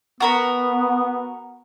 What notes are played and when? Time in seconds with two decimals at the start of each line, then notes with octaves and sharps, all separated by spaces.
0.20 B3 F#4 A#4 B5